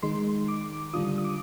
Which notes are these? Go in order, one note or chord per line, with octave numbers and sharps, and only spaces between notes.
D#3 G#3 D#4 C6
D6
D3 G3 D4 F4 D#6
D#6
D6